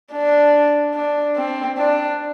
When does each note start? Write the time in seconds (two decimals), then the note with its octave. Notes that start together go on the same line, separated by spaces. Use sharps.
0.12 D4
0.94 D4
1.36 C4
1.78 D4